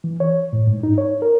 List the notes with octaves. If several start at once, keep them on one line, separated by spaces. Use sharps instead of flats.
E3
C#5
A2
G#2
D#4
C#5
A#4